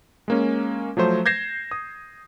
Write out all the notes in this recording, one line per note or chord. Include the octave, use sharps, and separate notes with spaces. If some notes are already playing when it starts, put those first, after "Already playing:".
G#3 A#3 C#4
F3 F#3 A3 C5
G6 G#6 A#6 C7 E7
D#6